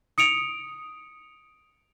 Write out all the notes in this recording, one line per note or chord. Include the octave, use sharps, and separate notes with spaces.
D#6 C#7 D7 F7